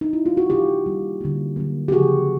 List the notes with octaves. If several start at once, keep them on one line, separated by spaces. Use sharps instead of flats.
D#4
E4
F4
F#4
C3 E3 G3 F4 G4
D#3 G3 A#3
D3 G3 A#3
D3 F#3 A#3
G4
C#3 F3 G#3 F#4 G#4